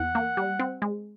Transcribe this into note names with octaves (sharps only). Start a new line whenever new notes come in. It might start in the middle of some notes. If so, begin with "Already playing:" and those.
Already playing: E2 F#5
A#3
G3
C4
G#3